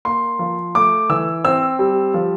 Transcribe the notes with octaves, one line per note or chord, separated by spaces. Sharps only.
A#3 C6
F3
A3 D6
E3 E6
C4 E6
G3
F3